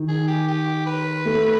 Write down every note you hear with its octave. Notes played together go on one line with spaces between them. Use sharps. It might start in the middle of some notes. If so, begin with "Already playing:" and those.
Already playing: D#3
G#4
G4
G4
B4
A3